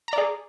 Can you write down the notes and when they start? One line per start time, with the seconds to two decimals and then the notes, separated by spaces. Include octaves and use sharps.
0.08 A#5
0.13 D5
0.18 G#4